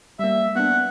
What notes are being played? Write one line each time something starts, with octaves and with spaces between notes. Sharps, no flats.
G3 A#3 E5
B3 D4 F#5